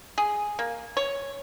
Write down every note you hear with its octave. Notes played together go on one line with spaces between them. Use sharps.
G#4
A#3
C#5